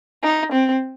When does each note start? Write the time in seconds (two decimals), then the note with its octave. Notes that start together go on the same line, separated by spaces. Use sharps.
0.23 D#4
0.52 C4